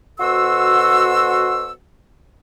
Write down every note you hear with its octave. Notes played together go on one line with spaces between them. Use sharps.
B2 F#4 A4 C5 C6 E6